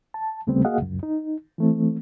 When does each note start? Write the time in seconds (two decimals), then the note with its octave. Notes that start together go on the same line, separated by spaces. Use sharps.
0.14 A5
0.47 D#2 C#3 G3 A3 B3 C4
0.65 A#3 F#4 G#4 D#5 F5 F#5
0.78 C#2 F#2
1.03 D#4
1.58 E3 A3 C4